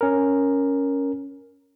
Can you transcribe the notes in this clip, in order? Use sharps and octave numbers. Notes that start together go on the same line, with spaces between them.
C#4 A#4